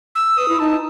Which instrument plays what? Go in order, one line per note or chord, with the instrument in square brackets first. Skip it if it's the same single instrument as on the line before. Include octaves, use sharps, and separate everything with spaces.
[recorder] E6
[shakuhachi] B4 [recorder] D#6
[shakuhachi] E4
[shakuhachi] D#4 [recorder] A5